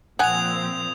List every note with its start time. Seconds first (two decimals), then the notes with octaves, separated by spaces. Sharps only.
0.19 A#2 F3 C4 F#5 G#5 D#6 G#6 F7